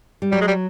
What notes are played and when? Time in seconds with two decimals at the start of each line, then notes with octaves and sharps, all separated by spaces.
0.22 G3
0.32 F#3 G3
0.41 G#3
0.47 G3